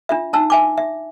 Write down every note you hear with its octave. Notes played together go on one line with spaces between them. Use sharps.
D4 F4 E5
D4 D#4 A5 E6
E5 G#5 D6
E5